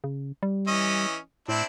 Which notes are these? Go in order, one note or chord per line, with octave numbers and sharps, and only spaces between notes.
C#3
G3
E3 C#4 D#5
A2 C4 D4 E4